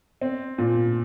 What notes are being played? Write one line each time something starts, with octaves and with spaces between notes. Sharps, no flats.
C4
A#2